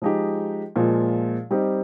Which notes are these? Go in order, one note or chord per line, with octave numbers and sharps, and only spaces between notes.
F3 G#3 D#4 G4
A#2 F3 G#3
G3 C4 D#4 G4